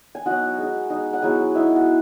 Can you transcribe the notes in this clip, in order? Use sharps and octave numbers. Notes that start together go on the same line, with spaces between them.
G#5
F#3 B3 D#4 F#4 F#5
G#3 D#4
G#3 D#4
F#5
F#3 B3 E4 G#4 G#5
G#3 D#4 E4 E5
F#4